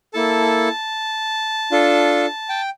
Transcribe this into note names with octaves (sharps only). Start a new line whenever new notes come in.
A#3 E4 A4 A5
D4 F4 A4
G5